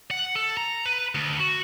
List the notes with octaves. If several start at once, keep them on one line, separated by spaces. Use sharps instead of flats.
F#5
A4
A#5
B4
D2
F#4